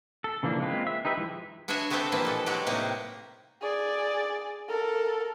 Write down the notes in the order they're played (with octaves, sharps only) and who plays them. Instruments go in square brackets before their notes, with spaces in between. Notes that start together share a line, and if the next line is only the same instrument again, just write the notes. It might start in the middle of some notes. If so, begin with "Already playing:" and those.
[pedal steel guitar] A4
C#3 E3 F3 A#3 D4
G#3 A#3 C4 F4 B4
E5
D#4 G4 B4 E5
E3 F3 G#3 E4
[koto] B3 D4 F#4 C#5 E5 G#5
A3 B3 C4 G4 A4 G5
A#2 E3 F3 G3 A#3 B3
B2 A4
F#3 G#3 F#4 G4 D5
A2 C3 G3 A#3 D#4
[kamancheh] G#4 D5
A4 A#4